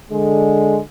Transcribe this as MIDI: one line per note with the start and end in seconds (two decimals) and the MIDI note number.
0.11 0.78 50
0.11 0.78 56